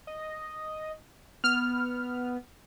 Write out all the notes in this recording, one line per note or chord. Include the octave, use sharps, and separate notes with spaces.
D#5
B3 F6